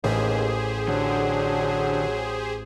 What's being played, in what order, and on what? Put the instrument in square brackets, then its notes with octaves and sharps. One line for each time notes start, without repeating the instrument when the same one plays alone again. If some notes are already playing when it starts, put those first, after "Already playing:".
[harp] A1 B6 [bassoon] D#2 [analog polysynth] G4 G#4 C5
[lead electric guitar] D3 [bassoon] F#3